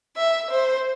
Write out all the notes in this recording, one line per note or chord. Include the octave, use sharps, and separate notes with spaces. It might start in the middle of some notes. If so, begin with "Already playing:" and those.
E5
C5